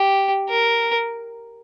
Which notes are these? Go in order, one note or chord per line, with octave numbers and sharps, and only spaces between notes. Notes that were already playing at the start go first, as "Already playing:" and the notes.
Already playing: G4
A#4